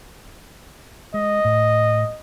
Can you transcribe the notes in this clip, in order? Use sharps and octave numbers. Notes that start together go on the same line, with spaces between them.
G#3 D#5
A2